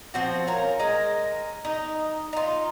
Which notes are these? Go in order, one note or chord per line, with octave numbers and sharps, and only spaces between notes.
F3 C4 F#4
C#4 F4 A#4
G#3 A#4
D#4
D#4 F4